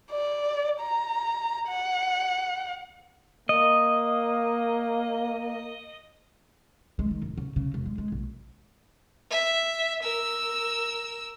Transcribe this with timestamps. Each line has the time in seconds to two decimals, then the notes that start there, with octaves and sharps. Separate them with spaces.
0.11 D5
0.81 A#5
1.68 F#5
3.49 A#3 D#5
6.99 G#3
7.11 D#3
7.22 D1
7.38 C#3
7.56 C#3
7.74 E1
7.86 G#3
7.98 G#3
8.12 A#1
9.31 E5
10.03 A#4 E6